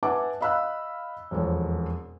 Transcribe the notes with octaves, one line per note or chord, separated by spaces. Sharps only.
B4 E5 F#5 G#5 A5 D6
D#5 F5 B5 E6 F#6
E1 F2 C#5